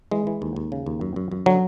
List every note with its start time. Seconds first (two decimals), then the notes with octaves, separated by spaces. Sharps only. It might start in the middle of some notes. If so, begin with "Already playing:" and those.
0.11 E3 G#3
0.27 E3
0.42 D#2
0.56 D#2
0.72 C#3
0.86 D#2
1.01 F#2
1.16 F#2
1.32 F#2
1.46 D3 F#3